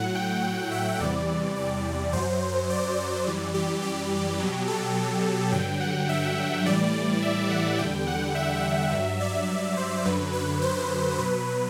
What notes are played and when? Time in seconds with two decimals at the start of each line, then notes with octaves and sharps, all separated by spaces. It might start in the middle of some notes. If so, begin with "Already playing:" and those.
Already playing: A2 F#3 F#5
0.15 G5
0.72 E5
1.00 E2 C3 E3 G3 D5
1.57 D5
2.13 F#2 F#3 C5
2.70 D5
2.98 D5
3.26 F#2 E3 G3
3.54 G4
3.83 G4
4.39 B2 F#3
4.68 A4
5.52 G2 D3 F#3 G5
5.80 F#5
6.09 E5
6.66 A2 E3 G3 D5
7.22 E5
7.50 F#5
7.78 E2 D3 G3 G5
8.07 F#5
8.35 E5
8.92 G2 F#3
9.20 D5
9.77 C5
10.05 F#2 D3 F#3 B4
10.33 B4
10.62 C5
11.18 B2 F#3 B4